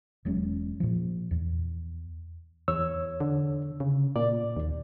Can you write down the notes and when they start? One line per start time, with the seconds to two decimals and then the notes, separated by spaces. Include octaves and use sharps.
0.25 E1 F#3 G#3 C#4
0.80 A#2 F3
1.31 E2
2.68 E2 C#5 E6
3.20 D3
3.80 C#3
4.16 A#2 D5
4.57 D#2